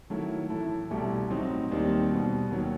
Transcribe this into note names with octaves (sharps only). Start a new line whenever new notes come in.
D#3 F#3 A3 E4
A2 E3 A3 E4 A4
C2 B2 A3 E4 G4
A2 F#3 C4 D#4
D#2 D#3 G3 C4 D#4
B2 G3 B3
D#2 D#3 F#3